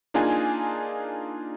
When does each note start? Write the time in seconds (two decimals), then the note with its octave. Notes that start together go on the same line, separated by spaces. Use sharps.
0.14 A#3 D4 D#4 F4 G#4 G#5